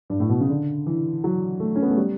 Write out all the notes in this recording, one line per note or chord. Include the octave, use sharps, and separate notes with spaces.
G2
A2
B2
C#3
D3
E3
F#3
A3
C#4
B3
A3
G3